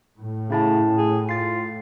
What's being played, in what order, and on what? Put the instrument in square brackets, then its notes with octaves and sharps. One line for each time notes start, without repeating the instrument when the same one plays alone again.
[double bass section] A2
[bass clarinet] C#3 [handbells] C#4 E4 A5
[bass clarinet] G#4
[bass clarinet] F4 [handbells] A6 C7